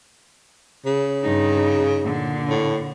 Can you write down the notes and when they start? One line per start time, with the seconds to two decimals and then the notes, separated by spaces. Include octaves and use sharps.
0.86 C#3
1.23 G2 D#4
2.04 A#2 D3
2.49 A2